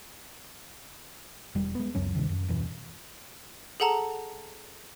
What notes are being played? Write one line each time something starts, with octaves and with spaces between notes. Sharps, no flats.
E1 G3
G#3 B3
C#2 F#2 F#3 C#4
D2 G2 C3 D#3
F#2
D#1 F#2 B2 E3
G#4 A4 F#5 A5 A#5